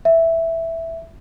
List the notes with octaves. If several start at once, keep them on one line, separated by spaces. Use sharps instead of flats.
E5